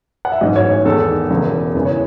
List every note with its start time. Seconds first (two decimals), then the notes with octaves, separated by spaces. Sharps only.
0.25 F#5
0.32 E5
0.41 A1 G#2 F#3 D#5
0.56 C#5
0.71 G#4
0.85 E2 D#3 G#3 A4
1.30 E1 E2 C#3
1.75 E2 C#3 E3 G#3 B4
1.85 C#5